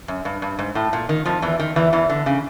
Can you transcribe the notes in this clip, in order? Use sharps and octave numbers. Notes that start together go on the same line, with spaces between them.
F#2
G2
G2
G#2
A2
A#2
D#3
F2 F3
E2 E3
D#3
E2 E3
E2 E3
D3
C#3